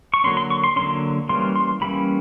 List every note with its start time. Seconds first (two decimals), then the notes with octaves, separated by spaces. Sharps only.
0.14 C#6
0.24 D3 F#3 A#3 C#4 C6
0.37 C6
0.50 C#6
0.64 C6
0.76 D3 F#3 A#3 C#4 C6
1.29 E3 G3 A#3 C#4 C6
1.56 C6
1.81 E3 G3 A#3 C#4 B5